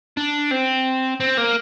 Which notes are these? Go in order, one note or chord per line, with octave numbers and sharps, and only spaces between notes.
D4
C4
C4
A#3